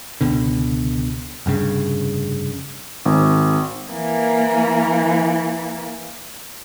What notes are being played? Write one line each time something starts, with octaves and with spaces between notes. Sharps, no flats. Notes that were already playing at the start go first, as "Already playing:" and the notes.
C#2 B2 D3
F1 G2 C#3
G#1
E3 A#3